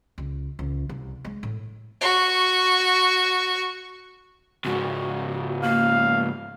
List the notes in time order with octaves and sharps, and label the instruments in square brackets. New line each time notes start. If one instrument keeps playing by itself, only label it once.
[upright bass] C#2
C#2
C2
G#3
A2
[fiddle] F#4 C#6
[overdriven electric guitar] C#2 G#2 [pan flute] F#4
[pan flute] A#3 [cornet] F5